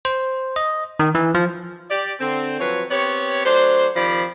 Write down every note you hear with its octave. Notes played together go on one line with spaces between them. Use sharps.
C5
D#5
D#3
E3
F3
G4 D5
D3 C4
F3 F#3 C4 B4 C#5
B3 C4 G4 C#5
F#3 A3 D4 C5
C3 D#3 F3 D5 B5